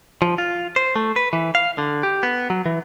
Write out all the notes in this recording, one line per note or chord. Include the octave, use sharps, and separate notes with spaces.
F3
F4
C5
A3
B4
E3
F5
D3
G4
B3
F#3
E3